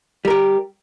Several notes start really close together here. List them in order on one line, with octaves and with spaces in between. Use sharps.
G3 A#4 G4